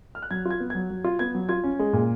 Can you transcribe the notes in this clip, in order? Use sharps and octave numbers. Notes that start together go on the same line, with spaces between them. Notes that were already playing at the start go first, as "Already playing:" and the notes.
F6
F#6
F#3 G#6
F4
G#6
B3
F#3 G#6
F#3
F4
B3 G#6
F#3
F4 G#6
C#4
G#3
A#2